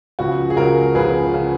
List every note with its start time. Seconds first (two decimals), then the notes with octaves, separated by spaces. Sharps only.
0.19 C#2 C#3 F3 F#4
0.50 G#4
0.56 C#2 C#3 F3 F#4 A#4
0.95 C#2 C#3 F3 G#4 B4
1.33 C#3 F3